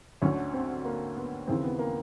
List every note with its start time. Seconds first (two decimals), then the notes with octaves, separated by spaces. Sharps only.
0.22 D2 D3 C#4
0.54 C4
0.85 A#3
1.16 B3
1.47 D#2 C#3 E3 C4
1.63 B3
1.79 A#3